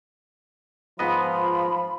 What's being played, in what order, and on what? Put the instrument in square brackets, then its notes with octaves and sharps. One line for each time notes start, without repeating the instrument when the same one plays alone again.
[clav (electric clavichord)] G#2 B3 D#5 [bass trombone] F3 [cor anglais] F4 [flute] B5